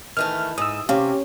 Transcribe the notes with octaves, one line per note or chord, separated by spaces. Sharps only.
D#3 E3 A3 F6
G#2 D#6 E6
C3 C#4 G4 F5